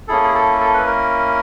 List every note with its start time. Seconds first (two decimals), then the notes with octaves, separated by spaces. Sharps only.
0.08 A#3 C#4 E4 G#4 A4
0.23 G#4
0.34 A4
0.60 A4
0.74 B4
0.86 A#4